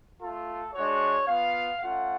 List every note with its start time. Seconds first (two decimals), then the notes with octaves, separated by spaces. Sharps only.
0.22 A3 F4 A4
0.74 G#3 D4 F#4 C#5
1.27 B3 F4 F5
1.81 A3 C#4 F4 F#5